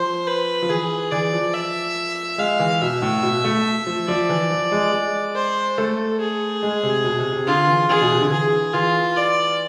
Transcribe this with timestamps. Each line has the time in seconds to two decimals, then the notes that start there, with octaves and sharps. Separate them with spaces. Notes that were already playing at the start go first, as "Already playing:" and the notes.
Already playing: F3 C5
0.27 B4
0.62 F3
0.69 E3 G#4
1.12 E3 D5
1.33 F3
1.54 E5
2.38 G#3 F5
2.60 E3
2.81 B2 E5
3.02 A2
3.23 B2
3.44 A3
3.87 F3
4.08 F3 D5
4.29 E3
4.51 F3
4.72 G#3
4.93 G#3
5.35 C5
5.78 A3 A4
6.20 G#4
6.63 G#3
6.83 C3
7.04 B2
7.19 C3
7.32 C3
7.47 D3 F4
7.68 E3
7.89 E3 G#4
8.01 B2
8.12 C3
8.21 D3
8.31 E3 G#4
8.73 E3 F4
9.17 D5